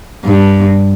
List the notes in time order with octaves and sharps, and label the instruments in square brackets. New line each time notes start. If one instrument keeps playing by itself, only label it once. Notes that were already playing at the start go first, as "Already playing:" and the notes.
[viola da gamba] G2